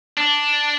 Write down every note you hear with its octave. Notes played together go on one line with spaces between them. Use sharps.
D4